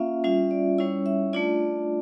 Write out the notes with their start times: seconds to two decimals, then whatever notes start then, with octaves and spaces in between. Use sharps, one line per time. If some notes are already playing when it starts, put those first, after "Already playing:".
Already playing: A#3 C#4 F4 E5 F5
0.24 G3 C#4 F4 E5
0.51 D5
0.78 G3 C#4 E4 C#5
1.06 E5
1.33 A3 D4 F4 D5